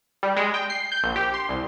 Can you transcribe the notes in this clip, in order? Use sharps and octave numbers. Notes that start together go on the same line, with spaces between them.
G3
G#3
G5
C7
G6
A#1
G4
C6
C2